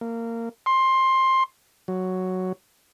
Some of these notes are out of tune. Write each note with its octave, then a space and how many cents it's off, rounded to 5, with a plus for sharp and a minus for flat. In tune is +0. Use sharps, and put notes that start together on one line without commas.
A#3 -20
C6 +15
F#3 +0